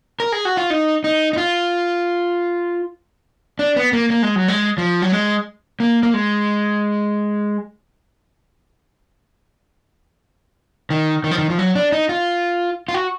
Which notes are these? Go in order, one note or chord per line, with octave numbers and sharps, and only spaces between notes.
A#4
G#4
F#4
F4
D#4
D#4
D#4
F4
D4
B3
A#3
A#3
G#3
F#3
G#3
F3
F#3
G#3
A#3
A#3
G#3
D#3
D#3
F3
D#3
F3
F#3
D4
D#4
F4
F4
F#4